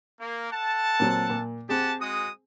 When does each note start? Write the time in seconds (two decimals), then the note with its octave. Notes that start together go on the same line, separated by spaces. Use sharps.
0.20 A#3
0.52 A4 F#5 A5
1.00 A#2 F#3 C4
1.30 A#2
1.69 C4 G4 G#4 F#5 A5
2.00 G#3 F#4 D#6